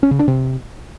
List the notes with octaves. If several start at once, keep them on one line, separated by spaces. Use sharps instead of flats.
C#4
C#3
D4
C3